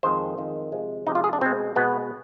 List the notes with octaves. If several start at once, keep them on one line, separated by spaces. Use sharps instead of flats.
F2 D#3 G#3 C5
F2 D#3 G#3
C3 F3 G#3
C3 F3 G#3 D#4
F4
G#4
D4
B2 G#3 C4
B2 G#3 B3